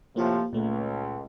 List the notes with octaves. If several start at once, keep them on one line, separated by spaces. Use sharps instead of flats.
A2 C3 F3 A#3 F4 G4
C#2 A#2 A3